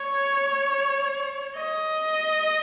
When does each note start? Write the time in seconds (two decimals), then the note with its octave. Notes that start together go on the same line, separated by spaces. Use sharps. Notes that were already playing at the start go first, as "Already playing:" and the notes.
Already playing: C#5
1.56 D#5